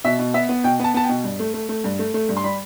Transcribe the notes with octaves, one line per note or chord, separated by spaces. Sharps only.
B2 E5
B2
B3 E5
B3
B2 G5
B3 A5
B3 A5
G5
B2
G2
A3
A3
A3
G2
A3
A3
G2
C6
G3 B5